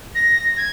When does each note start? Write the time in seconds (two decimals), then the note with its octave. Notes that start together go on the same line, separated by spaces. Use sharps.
0.15 A#6
0.57 G#6